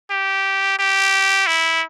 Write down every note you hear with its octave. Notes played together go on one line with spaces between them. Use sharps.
G4
G4
E4